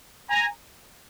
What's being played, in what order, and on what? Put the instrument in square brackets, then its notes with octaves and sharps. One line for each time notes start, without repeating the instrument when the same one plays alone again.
[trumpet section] G#5 A#5